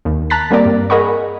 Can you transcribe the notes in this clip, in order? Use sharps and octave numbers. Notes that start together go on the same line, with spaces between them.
D#2
A5 A#5 F#6 A6 B6
G3 A#3 C4 A#4 D5
G2
G#4 A#4 D#5 F#5 B5 C#6